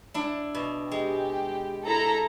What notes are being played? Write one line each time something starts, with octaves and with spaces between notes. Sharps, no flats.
D4 E4
B2
G#3 G4
E4 A4 A#5